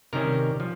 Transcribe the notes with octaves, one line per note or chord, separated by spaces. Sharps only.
C3 D#3 G3 C#4 A#4
F3